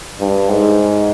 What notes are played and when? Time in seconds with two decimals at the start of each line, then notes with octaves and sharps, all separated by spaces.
0.20 G2
0.49 G#2